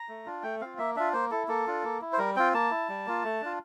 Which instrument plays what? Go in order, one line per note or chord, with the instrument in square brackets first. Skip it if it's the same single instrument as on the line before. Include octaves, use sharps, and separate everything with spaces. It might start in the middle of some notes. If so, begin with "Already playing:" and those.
Already playing: [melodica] A#5
A3
D4 F4
A3 G5
C4 F4 F5
A#3 E5
D4 F4 E5
A#3 C5
E4 A4
A#3 A4
D4 F4
A#3
E4
C5
G3 A#4
C4 F4 G5
A#3 A5
E4
G3
A#3 F4
A3
D4 F4